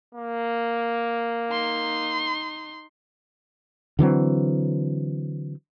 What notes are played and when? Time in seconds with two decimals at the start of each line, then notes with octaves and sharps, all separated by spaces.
0.15 A#3
1.51 D#4 C6
3.99 D3 E3 F#3 C4